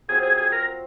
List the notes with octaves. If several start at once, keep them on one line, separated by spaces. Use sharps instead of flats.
F#3 C4 F4 G#4 C5
G#4
G#4
A#4